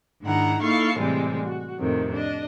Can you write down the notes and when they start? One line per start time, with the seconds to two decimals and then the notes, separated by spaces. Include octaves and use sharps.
0.22 G#2 D#3 D4 E4 F#5 A#5
0.63 A#3 D#4 E4 A4 F5 C#6
0.98 A2 C3 E3 G3 G#3 C4
1.45 F#4
1.79 F2 A2 C3 D#3
2.14 D4 D#5